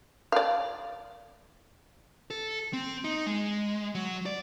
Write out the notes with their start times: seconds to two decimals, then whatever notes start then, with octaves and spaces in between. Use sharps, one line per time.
0.32 D5 F5
2.30 A4
2.73 C4
3.04 D#4
3.26 G#3
3.95 F#3
4.26 D5